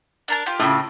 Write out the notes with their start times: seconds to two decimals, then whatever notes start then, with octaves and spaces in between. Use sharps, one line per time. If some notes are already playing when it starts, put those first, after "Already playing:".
0.28 D4 A#4 A5
0.46 F4 G4
0.59 A2 C#3